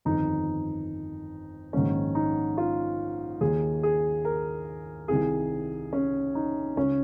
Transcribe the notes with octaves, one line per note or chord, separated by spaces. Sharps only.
G1 F2 D#3 D#4
A#1 G#2 D#3 C#4
D#4
F4
D#2 D#3 G#4
G#4
A#4
C2 C3 D#3 G#4
C#4
D#4
C#2 C#3 C#4